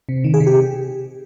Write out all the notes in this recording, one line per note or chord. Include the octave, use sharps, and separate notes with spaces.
C3
D#3
G#4
C3
G4